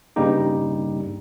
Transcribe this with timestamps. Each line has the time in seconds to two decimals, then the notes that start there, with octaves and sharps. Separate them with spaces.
0.16 G2 C#3 G3 A#3 D#4 G4